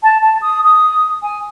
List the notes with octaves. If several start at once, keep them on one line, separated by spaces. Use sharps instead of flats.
A5
A5
D#6
D#6
G#5